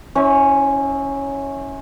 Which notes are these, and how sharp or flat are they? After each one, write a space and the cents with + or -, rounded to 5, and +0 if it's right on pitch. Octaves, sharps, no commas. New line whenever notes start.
C#4 +0 E4 -25 C5 +40